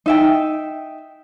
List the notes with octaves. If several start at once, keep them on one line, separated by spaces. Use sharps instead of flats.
D#4 E5 G5